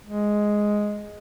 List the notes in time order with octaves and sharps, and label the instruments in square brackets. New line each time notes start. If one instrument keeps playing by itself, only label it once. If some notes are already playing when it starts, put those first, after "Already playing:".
[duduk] G#3